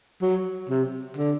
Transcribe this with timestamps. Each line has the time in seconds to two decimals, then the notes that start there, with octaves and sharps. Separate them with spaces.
0.22 F#3
0.69 C3
1.17 D3